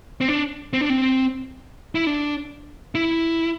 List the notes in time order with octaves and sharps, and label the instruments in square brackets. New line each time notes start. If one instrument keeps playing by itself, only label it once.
[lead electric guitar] C4
D4
C4
D4
C4
E4
D4
E4